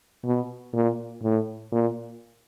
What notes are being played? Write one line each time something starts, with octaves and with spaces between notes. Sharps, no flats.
B2
A#2
A2
A#2